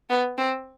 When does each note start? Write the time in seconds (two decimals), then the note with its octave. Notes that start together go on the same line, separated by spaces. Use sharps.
0.10 B3
0.37 C4